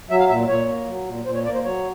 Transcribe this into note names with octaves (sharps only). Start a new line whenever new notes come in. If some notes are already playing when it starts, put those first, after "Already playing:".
F#3 E5
F5
A#2 E5
A#2 C#5
A#3
F#3
A#2
A#2 C5
C#5
A#3 D5
C5
F#3 C#5